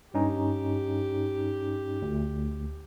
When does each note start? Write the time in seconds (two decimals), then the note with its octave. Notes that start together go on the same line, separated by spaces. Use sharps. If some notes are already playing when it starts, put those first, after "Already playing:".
0.14 G2 C#4 D#4 G4
2.02 D2